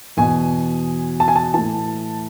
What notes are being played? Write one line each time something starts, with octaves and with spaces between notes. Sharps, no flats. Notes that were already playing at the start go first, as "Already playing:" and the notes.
E2 B2 G#5
A5
G#5
A5
A2 E3 A5